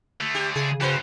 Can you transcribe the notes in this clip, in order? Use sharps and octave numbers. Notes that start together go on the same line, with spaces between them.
D3 A3
G4
C#3 G#4
G2 C#4 F#4 B4 C5